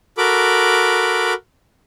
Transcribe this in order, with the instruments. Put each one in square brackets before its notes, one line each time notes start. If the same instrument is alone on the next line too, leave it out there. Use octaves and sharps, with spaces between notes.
[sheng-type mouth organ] F#4 A4 A#4 B5 D6